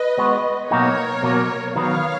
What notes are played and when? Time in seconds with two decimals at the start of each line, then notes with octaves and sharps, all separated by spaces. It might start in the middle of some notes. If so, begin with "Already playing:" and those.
Already playing: B4 D#5
0.18 G#3 B3 F#4
0.70 B2 F#3 A#3 D#4 F#4 A#4 C#5
1.23 B2 F#3 A#3
1.76 D#3 F#3 B3 C#5 F5